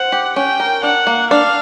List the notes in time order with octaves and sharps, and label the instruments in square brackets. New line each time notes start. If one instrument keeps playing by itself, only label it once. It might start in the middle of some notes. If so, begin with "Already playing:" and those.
Already playing: [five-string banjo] C5 [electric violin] F#5
[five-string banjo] G4
[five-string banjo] C#4 [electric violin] G5
[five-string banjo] A#4
[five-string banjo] D4 [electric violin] F#5
[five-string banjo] A#3
[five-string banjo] D4 [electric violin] F5